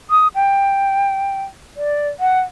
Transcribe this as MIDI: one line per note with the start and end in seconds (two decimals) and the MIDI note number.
0.10 0.28 87
0.35 1.43 79
1.77 2.08 74
2.20 2.40 78